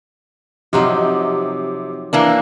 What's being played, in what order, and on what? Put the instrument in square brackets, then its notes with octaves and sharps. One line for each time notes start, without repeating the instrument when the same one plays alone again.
[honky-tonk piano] C3 [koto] F3 F#3 D#4
[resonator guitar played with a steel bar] E3 A#3 D4